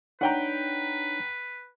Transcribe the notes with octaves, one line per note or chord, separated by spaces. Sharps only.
D4 D#4 B4 C#5 F#5 G5 A#5